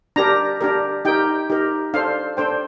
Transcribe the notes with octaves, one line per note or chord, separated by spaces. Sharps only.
D4 G4 A#4 A#5
D4 G4 A#4
D#4 G4 A#4 G5
D#4 G4 A#4
D4 A4 C5 F5
D4 A4 C5 G5